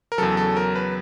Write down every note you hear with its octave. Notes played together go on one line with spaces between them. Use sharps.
A#4
E2 C#3 F#3 A4
A4
A#4
B4